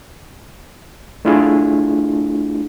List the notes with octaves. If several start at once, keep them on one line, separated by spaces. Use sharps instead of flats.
A3 D4 E4 F4 G#4